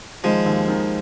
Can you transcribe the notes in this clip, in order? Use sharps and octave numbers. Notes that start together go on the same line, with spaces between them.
D#3 F3 G#3
D#2
D#3